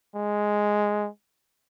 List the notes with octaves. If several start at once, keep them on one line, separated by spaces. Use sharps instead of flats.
G#3